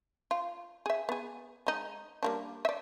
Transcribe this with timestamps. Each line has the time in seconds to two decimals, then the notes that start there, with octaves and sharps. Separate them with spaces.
0.31 F4
0.86 G#4 E5
1.09 B3 G#4
1.67 G#3 D#4
2.23 G3 A#3 D4
2.65 D5 E5